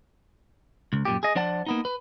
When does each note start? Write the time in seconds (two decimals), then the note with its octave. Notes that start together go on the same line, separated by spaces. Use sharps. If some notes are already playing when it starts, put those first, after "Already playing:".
0.93 C#2
1.05 F#2 A#2 G4
1.23 G#4 D#5
1.35 F3 D4 C5 D5 F#5 A5
1.66 A#3 B3 D#4
1.85 B4